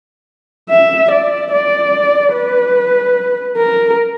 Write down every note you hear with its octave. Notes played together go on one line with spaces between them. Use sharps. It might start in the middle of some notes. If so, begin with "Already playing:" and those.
E5
D5
D5
B4
A#4